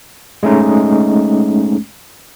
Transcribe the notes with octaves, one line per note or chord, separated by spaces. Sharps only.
G#3 A3 C#4 D#4